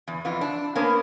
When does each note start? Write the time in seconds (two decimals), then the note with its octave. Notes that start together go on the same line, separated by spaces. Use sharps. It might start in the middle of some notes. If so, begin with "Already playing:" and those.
0.08 E2
0.25 F2 E3 B3 F4
0.41 D4
0.75 A#3 B3 C#4 A#4 C5